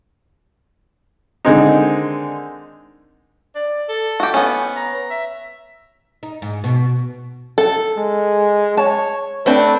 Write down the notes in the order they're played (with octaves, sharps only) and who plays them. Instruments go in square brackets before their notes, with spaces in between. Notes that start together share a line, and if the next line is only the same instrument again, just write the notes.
[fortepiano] D3 D#3 G#3 C4 D#4
[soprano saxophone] D5
A4
[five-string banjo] F#4 G4
B3 C#4
[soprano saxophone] A#5
E5
[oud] D#4
G#2
B2
[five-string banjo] A4
[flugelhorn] G#3
[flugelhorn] C#5 [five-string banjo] A5
[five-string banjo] A3 C4 D4 [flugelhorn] B4